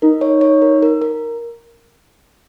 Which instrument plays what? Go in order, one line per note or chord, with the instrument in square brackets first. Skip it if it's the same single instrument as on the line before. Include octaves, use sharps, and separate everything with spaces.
[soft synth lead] D#4 [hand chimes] A#4
[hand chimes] C#5
C#5
A#4
A#4
A#4